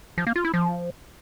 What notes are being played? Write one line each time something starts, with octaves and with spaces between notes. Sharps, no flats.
F3
A#3
F4
E4
F3